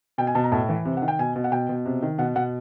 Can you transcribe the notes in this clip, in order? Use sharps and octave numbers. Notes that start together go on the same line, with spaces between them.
B2 G5
G#5
B2 A5
A#5
A2 A5
E3
C3
F#5
D#3
G5
B2 G#5
B2
F#5
B2 G5
B2
C3
D#3
B2 F#5
B2 F#5